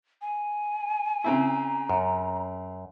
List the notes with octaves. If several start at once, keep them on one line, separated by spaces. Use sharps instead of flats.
G#5
C#3 C4 E4 A#5
F#2